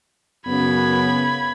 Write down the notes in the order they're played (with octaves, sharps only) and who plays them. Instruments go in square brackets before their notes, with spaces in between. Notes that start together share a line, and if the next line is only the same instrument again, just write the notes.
[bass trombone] F#2 [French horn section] C#3 B3 [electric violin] B5 G#6